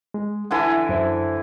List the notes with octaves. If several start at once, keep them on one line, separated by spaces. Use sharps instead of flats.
G#3
D3 E3 E4 F#5
F#2 C5 E5